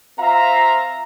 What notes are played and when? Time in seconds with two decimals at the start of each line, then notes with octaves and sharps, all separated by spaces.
0.19 C4 F4 E5 F5 A#5